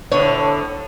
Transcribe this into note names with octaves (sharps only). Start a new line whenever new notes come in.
A2 D3 C#5